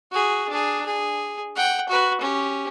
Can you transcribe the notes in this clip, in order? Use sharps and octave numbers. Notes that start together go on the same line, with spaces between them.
F#4 G#4
D4 G#4
G#4
F#5 G5
F#4 B4
C#4 G4